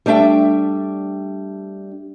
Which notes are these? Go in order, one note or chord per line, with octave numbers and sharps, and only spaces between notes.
G3 A3 D4 E5 G5